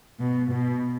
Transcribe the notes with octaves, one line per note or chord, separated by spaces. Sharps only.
B2
B2